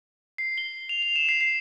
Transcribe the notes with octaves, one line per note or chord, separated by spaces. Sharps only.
C7
G7
F7
F7
E7
C7
C7